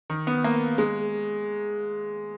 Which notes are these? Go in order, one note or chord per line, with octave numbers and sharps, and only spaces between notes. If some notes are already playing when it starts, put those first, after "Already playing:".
D#3
B3
A#3
G#3